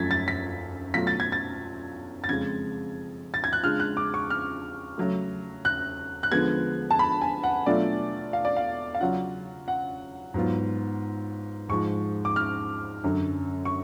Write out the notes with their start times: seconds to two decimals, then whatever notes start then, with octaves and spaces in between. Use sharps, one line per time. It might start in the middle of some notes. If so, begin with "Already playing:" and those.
Already playing: F#2 F3 A3 F4 G#6 A6 B6
0.11 A6
0.28 B6
0.94 B2 F#3 A3 F4 B6
1.07 A6
1.20 G#6
1.32 A6
2.24 A6
2.29 F2 C#3 G#3 G#6
3.34 A6
3.44 G#6
3.53 F#6
3.63 C#3 G#3 D4 F4 F6
3.80 F#6
3.97 D6
4.14 C#6
4.30 F6
4.98 C#3 F#3 A3
5.65 F#6
6.23 F#6
6.32 D3 F3 G#3 B3 G#6
6.91 A5
6.99 B5
7.21 G#5
7.43 F#5
7.66 B2 F#3 A3 D4 F4 D5
8.33 F5
8.45 D5
8.56 F5
8.94 F5
9.00 C#3 F#3 C#4 F4 F#5
9.68 F#5
10.34 G#2 F#3 B3 F4
11.69 G#2 F3 G#3 C#6
12.25 D6
12.36 F6
13.04 F#2 D3 F#3
13.65 C#6